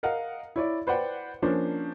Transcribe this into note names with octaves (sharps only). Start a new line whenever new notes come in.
A#4 D#5 F5 F#5
E4 C#5 D5
B4 C5 D5 F#5 G5
F3 A#3 C#4 D4 C5